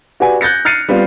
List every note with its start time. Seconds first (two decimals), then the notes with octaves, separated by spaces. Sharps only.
0.20 F#4 G4 B4 D5 F#5 G#5
0.41 F#6 G6 A6 A#6 C#7
0.65 F6 F#6 A6 C7 C#7 D#7
0.89 G3 B3 C4 F4